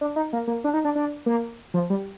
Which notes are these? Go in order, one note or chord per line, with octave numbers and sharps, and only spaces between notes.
D4
D#4
A#3
A#3
D4
D#4
D4
D4
A#3
F3
G3